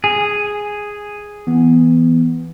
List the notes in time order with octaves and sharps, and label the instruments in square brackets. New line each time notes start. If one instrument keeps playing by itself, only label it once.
[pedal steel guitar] G#4
[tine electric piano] E3 B3